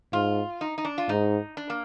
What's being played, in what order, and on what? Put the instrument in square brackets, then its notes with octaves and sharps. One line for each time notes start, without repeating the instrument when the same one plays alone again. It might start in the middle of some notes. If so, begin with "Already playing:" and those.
[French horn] G#2 [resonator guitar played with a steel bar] F4
[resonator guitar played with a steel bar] D#4
D#4
D4
F4
[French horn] G#2 [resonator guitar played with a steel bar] D#4
[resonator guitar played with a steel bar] D4
A#3